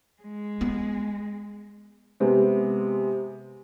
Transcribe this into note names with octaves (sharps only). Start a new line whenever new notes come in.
G#3
B3
C3 G#3 B3